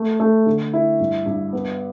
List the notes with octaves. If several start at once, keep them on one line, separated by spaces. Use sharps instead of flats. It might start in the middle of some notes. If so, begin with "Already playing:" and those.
Already playing: A3
A3
D3
E4
G2
G2
B3